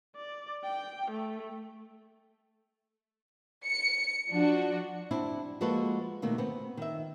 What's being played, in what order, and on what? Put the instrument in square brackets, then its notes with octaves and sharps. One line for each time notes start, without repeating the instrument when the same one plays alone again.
[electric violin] D5
G5
A3
[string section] C#7
F3 D4 F#4
[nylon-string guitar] C4 D4 E4
F3 G#3 A#3 F#4 A4 B4
B2 D#3 A3 A#3
B3 C4
D#3 E5